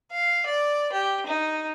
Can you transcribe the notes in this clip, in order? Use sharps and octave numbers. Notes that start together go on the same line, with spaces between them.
F5
D5
G4
D#4